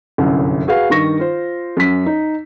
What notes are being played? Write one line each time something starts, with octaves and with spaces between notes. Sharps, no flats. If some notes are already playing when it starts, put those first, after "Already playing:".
G1 C2 F#2
F#4 G#4 B4 F5
G2 D#3 C#6 A#6
F4 C5
F#2 B6
D#4